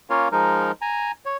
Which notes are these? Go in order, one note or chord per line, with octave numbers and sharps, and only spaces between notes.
A#3 C#4 F4 A#4 C#5 F5
F3 G#3 D#4 A#4
G#5 A#5
C#5